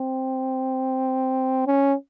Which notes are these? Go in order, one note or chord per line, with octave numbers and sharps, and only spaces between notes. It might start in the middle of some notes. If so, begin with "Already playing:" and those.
Already playing: C4
C#4